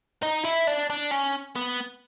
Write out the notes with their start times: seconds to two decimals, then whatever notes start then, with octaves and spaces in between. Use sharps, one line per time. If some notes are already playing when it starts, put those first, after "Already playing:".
0.23 D#4
0.45 E4
0.67 D4
0.90 D4
1.11 C#4
1.56 B3